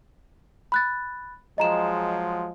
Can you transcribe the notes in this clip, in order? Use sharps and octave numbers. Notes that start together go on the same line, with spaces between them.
B5 F#6 A6
F3 F#3 G#3 D#5 A#5 E7